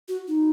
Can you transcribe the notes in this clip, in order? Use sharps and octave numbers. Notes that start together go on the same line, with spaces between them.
F#4
D#4